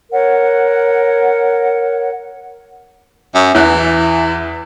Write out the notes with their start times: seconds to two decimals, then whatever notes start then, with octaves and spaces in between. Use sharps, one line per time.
0.12 A#4 C#5 F#5
3.35 F#2
3.55 E2 E3 F#6